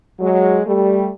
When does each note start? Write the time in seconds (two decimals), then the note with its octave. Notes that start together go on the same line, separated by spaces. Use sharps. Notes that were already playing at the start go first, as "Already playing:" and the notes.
0.19 F#3 G#3
0.66 G3 A3